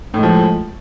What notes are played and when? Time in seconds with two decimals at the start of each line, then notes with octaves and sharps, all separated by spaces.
0.14 A2
0.18 G#3
0.23 F3